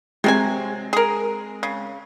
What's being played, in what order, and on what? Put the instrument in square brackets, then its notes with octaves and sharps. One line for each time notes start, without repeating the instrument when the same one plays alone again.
[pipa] C3 F#3 G#5 [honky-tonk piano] G#3 C4
[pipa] G#4 A#4
C#3